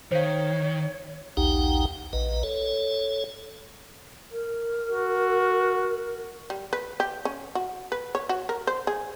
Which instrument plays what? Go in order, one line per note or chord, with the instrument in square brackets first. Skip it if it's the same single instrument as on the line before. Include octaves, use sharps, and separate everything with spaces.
[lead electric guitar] D#3 [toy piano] C5 F5 [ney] C#5
[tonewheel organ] A#1 D#2 D#4 G4 F#5 G5
A#1 B4 D#5
A4 C#5
[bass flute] A#4
[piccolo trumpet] F#4
[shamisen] G3
B4
G4
C#4
F#4
B4
C#5
F#4
A#4
C5
G#4